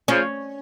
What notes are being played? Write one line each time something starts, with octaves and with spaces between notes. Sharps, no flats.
C#3 F3 C#4